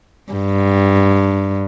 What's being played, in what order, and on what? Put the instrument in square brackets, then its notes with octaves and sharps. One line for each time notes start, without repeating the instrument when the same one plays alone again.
[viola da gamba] G2